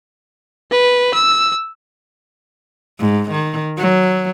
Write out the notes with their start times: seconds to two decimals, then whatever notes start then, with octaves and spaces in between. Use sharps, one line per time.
0.71 B4
1.14 E6
3.00 G#2
3.31 D#3
3.78 F#3